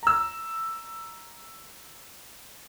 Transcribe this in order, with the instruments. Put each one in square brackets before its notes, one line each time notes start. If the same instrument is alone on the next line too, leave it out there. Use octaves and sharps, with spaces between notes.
[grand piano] A#5 E6